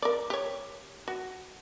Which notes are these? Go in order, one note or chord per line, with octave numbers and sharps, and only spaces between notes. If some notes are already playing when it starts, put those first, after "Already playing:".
A#4 D5
G4 C#5
F#4